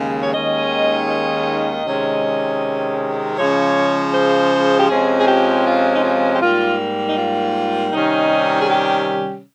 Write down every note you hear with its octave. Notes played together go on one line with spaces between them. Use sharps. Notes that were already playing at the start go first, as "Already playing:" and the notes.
Already playing: D#2 C#3 G#3
C#5
D#2 D#3 G#3 C#4 D#5
D#5
C3 D#3 G#3 C#4
C#3 F3 G#3 C#5
C5
G4
F2 C3 F3 G#3 C#4 G#4
G#4
G4
F4
D#4
F4
G4
G#2 G3 A#3 F4
D#4
F4
C3 D#3 G3 C#4 D#4
G#4
G4